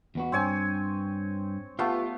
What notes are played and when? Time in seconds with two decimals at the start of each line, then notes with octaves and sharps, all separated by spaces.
0.15 E2 B3 F#4
0.32 G2 C4 C#5 G#5
1.79 A3 B3 F4 G4 F5